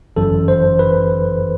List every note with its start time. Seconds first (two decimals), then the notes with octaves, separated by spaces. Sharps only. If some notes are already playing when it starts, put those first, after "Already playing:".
0.16 G1 F#2 E3 A4
0.48 C5
0.79 B4